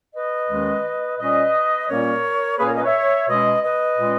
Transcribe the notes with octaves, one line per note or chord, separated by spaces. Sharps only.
B4 D#5
D#2 D#3 G#3 C#4
A#2 G3 C#4 B4 D#5
A#2 G3 A#3 C#4 A#4 C#5
A#2 A#3 C#4 G#4 B4
A#4 C#5
B4 D#5
C#5 E5
B2 G#3 C#4 B4 D#5
B4 D#5
A#2 G#3 C#4